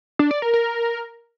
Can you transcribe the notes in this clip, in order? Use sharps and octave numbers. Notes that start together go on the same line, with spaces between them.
D4
D5
A#4
A#4